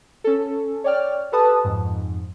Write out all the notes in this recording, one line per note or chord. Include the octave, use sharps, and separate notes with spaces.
C#4 A4
C#5 D5 G5 F6
G4 A4 B4 A5 D#6
F2 G#2